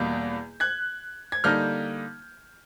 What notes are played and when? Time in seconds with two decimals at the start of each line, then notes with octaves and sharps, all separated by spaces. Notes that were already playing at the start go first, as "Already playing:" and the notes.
Already playing: E2 B2 G3 A#3 G6
0.60 F#6 G#6
1.32 G#6
1.44 D3 G3 A#3 D#4 F6 G6